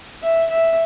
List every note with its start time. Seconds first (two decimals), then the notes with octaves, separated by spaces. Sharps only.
0.22 E5
0.50 E5